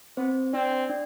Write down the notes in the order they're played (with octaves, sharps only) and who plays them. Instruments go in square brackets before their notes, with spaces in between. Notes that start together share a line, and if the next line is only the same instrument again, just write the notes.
[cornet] B3 [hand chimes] C4 C5
[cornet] C4 [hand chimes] D4 D5
[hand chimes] D4 D5